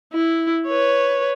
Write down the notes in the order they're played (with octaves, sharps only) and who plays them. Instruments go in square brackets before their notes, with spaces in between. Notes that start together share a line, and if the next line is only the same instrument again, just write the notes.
[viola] E4
B4 C#5